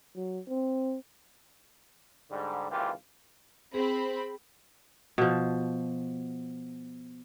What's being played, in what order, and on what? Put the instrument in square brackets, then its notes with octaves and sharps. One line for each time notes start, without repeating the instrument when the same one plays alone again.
[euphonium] F#3
C4
[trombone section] G#2 D3 G3
G#1 C#2 E3 A#3 F4 G4
[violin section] C4 B5 [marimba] G#4
[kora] B2 F3